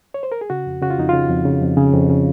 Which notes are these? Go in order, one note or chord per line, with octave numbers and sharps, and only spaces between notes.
C#5
C5
A#4
G#4
C#3 F#4
F2
C#3 F#4
F4
F2 D#4
C#3 F4
F2
C#3
F2
C#3
F2
C#3